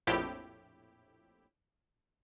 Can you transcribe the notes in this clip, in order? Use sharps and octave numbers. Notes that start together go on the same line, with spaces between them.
A#1 F2 A2 E4 G4